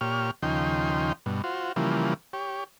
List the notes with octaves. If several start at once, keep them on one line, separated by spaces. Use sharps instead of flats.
A#2 G4 C#5 F6
D#2 C#3 F3 D#4 G5 C6
G2 B2
F4 F#4 C5
C#3 E3 F3 G3 A#3
G4 C#5